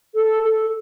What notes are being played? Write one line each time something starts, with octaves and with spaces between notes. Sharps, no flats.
A4
A4